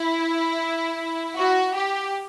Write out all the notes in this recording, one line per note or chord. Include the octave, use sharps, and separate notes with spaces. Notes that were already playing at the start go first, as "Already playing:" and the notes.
Already playing: E4
F#4
G4